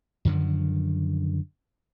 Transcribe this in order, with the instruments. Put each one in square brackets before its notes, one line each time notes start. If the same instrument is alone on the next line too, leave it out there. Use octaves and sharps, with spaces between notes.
[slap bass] F#2 D3 D#3 F3